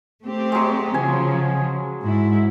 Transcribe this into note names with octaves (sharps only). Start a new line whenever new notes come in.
A3 C4 G4
F#3 G#3
C#3 F3 G#5
G#2 E4